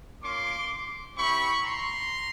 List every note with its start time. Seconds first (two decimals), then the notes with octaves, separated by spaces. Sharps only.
0.22 A#3 C#4 F4 C6 D6
1.17 C4 E4 G4 B5 C#6
1.64 A#5 C6